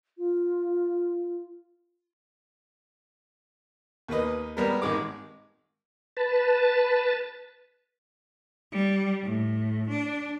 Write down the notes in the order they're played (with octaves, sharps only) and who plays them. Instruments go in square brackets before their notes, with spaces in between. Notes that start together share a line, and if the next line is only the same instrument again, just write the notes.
[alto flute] F4
[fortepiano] D#2 A#3 B4 D#5
G3 G#3 B3 A#4
G#1 D#3 G#3 D6
[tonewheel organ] B4 A5
[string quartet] G3
A2
D4